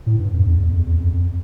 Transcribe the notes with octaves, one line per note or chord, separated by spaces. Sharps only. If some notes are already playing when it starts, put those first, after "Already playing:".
A2
G2
F2
E2
E2
F2
E2
F2
F2